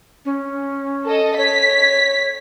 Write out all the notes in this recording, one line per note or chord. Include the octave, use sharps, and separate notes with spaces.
C#4
A4 D#5
C#5 B6